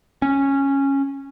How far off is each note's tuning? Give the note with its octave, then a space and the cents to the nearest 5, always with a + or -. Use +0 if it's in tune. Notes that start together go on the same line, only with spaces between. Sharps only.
C#4 -10